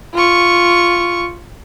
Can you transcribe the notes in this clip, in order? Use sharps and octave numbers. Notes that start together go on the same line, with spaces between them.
F4 C#6